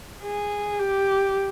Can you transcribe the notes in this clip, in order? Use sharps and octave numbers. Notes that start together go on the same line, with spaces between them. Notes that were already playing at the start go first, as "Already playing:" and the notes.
G#4
G4